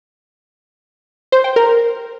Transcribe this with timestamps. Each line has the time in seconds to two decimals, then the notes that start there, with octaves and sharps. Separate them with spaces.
1.32 C5
1.44 G5
1.56 A#4